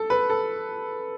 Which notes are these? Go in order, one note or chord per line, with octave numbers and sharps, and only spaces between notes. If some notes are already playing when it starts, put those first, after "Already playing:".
Already playing: A4
B4
A4